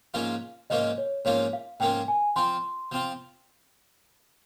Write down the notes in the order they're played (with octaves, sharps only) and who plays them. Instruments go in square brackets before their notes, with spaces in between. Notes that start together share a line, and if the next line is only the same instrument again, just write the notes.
[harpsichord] G#2 F3 A#3 C#4 F4 [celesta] F5
[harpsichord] G#2 F3 A#3 C#4 F4 [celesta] D#5
[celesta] C#5
[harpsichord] G#2 F3 A#3 C#4 F4 [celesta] C#5
[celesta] F5
[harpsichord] G#2 F3 A#3 C#4 F4 [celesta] G5
[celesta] G#5
[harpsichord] F3 C4 F4 [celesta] C6
[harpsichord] F3 C4 F4